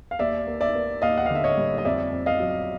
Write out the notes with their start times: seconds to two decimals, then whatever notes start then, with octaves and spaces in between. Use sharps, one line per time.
0.11 F5
0.19 D#2 D5 E5
0.47 A#3
0.61 D5 E5
0.75 A#3
1.02 D#2 D#5 F5
1.18 F#5
1.26 F5
1.30 D3 E5
1.44 C#5 D#5
1.57 G3
1.78 D#5
1.85 F2 D5 E5
2.12 F2
2.26 D#5 F5
2.40 F#3